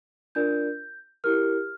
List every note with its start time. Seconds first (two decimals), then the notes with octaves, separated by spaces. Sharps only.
0.35 D4 F4 A#4 D5 G6
1.24 E4 G4 A#4 F6